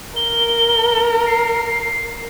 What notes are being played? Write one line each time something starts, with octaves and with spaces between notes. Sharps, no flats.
A#4 G7
C7